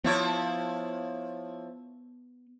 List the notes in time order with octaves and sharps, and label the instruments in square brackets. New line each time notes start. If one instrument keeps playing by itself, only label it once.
[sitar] F3 E4 C#5 [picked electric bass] B3